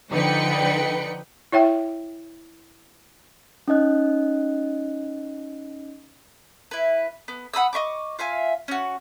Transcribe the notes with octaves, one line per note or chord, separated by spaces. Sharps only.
D3 F3 D#4 B4 G5 C#7
E4 C#5 E5 G5
C#4 D#4 D#5 F#6
E4 B4
B3
F#5 B5 D#6 E6
D#5 E5 C#6 D6
F4 E5 F5 G#5
C#4 F#4